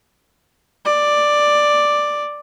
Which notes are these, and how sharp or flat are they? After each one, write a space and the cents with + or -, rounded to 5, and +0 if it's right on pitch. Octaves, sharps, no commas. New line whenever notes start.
D5 +5